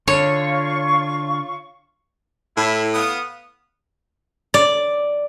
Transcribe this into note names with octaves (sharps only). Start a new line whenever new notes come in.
D3 F4 C#5 F5 C#6
A2 E4
B3 F5 D#6
D5